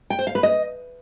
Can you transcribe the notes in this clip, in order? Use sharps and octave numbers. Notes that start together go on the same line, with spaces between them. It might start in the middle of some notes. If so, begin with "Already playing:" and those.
G5
C5
F5
B4
D#5